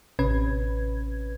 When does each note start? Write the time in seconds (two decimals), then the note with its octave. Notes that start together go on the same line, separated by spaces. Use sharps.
0.19 A1 C3 C#4 B4 G#6